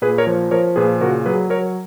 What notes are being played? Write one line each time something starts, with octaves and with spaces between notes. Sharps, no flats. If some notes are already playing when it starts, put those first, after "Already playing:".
A#2 G#4 B4
A#4 C#5
F3
F3 A#4 C#5
A#2 G#4 B4
C#3 F#4 A#4
F#3 G#4 B4
F#3 A#4 C#5